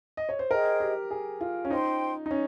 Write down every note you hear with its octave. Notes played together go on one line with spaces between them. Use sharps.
D#5
C#5
C5
G#4 A#4 C5 D#5 G5
G4
G#4
F4
C#4
D#4 C5 G5 C6
D#4
C#4